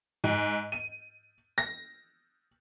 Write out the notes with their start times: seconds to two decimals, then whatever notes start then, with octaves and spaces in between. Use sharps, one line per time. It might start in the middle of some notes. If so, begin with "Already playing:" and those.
0.24 G#2
0.72 D#7
1.58 A#6